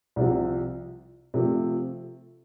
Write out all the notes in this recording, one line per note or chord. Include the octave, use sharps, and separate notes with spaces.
C2 C3 F3
C3 F3 A3